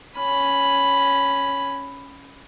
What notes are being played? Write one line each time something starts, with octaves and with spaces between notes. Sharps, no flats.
C#4 B5